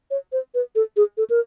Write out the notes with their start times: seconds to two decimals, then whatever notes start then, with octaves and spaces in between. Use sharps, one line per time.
0.11 C#5
0.32 C5
0.54 B4
0.75 A4
0.97 G#4
1.17 A4
1.30 A#4